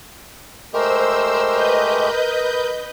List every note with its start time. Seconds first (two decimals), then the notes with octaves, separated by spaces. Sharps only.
0.73 G#3 A3 G4 A#4 C5 E6
1.53 B4 D#5 G6